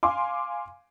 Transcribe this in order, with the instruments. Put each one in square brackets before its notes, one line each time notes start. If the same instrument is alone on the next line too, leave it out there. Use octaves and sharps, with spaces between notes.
[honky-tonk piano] F5 G#5 C6 D6